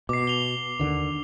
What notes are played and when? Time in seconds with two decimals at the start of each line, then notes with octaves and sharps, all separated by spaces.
0.09 B2 D6 C7
0.27 F7 G7
0.80 D#2 D3 D#3